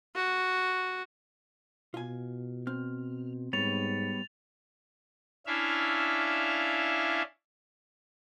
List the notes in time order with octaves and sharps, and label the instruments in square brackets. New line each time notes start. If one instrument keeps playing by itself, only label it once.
[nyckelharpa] F#4
[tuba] B2 [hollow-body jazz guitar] F4 G#5
[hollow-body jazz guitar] C4 [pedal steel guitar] F6
[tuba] G#2 [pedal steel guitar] G3 B3 C#5 [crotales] A6 F7
[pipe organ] C#4 D4 E4 E5 F5